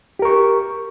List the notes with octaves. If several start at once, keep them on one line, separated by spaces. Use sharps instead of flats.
G4 A#4 C#6